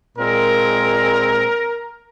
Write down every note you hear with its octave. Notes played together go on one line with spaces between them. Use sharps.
A#2 G#3 C4 A#4